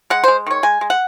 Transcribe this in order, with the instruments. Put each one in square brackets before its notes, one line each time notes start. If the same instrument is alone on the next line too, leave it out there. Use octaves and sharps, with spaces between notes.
[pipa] G#3 F#5
G#3 C5
D#3 C#5
G#3 G#5
G#3
F#5